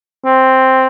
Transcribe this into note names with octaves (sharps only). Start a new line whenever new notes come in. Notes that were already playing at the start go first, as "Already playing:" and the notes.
C4